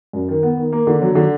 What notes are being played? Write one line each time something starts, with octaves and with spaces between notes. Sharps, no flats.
F#2
D#3
B3
D#3
A#3
D3
F#3
D3